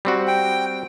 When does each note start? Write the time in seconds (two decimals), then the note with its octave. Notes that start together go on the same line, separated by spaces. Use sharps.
0.05 G3 C4 F#4
0.28 G5